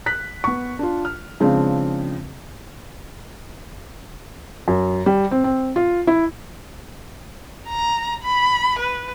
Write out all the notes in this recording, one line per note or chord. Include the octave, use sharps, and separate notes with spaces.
F#6 B6
B3 C#6
D4 F4
F6
C#3 F3 G#3 C4 D4
F#2
G3
C4
C4
F4
E4
A#5
B5
B4